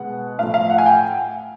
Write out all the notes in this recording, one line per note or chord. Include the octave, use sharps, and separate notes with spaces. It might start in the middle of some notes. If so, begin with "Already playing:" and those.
Already playing: B2 G#3 B3 F#5
A2 F3 A3 F5
F5
F#5
G#5
G5